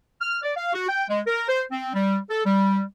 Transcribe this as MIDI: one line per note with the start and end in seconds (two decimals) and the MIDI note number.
0.21 0.38 89
0.43 0.52 74
0.57 0.69 77
0.73 0.85 66
0.89 1.05 79
1.10 1.20 56
1.27 1.43 70
1.49 1.63 72
1.72 1.90 60
1.94 2.18 55
2.30 2.42 69
2.46 2.82 55